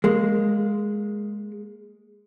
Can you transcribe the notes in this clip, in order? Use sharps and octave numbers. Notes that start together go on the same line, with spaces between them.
G#3 A#3